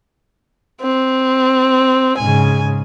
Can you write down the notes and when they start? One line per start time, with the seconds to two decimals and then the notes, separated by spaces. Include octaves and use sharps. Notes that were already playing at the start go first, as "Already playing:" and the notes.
0.82 C4
2.18 G#2 C#3 G#5